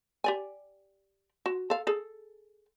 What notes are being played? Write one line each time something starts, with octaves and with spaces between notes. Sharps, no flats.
G4 D5 G#5
F#4
A4 F5
G#4 A4